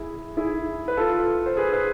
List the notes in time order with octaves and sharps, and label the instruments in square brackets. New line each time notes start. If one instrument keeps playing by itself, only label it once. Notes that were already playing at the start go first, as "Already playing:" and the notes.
Already playing: [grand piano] E4 G#4
E4 G#4
B4
F4 A4
C5
G#4 B4
G#4 B4